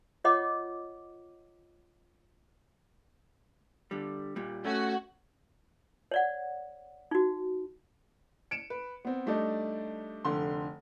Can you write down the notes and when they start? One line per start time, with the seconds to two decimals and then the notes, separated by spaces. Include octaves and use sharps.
0.24 F4 C#5 D#5 F#5 D6
3.91 D3 G3
4.36 A#2 G3
4.65 A3 C#4 F#4
6.11 C#5 D5 F#5
7.11 D#4 F#4
8.51 C#7 D7 E7
8.70 B4
9.05 B3 C4
9.26 G3 A3 D4 D#4 D5
10.25 F1 D3 C6